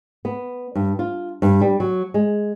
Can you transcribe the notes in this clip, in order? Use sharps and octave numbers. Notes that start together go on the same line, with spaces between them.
B3
G2
F4
G2
G3
F#3
G#3